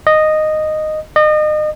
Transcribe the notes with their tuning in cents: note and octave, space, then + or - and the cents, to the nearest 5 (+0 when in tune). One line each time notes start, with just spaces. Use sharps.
D#5 -10
D#5 -35